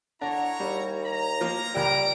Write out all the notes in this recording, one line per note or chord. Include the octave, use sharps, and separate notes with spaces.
D3 D4 E4 C#5 A#5
D#2 G3
A#5
F3 A#3 F4
C#2 G3 A#4 A#6 D7